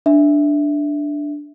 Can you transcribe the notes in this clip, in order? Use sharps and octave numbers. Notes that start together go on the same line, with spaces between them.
D4 E5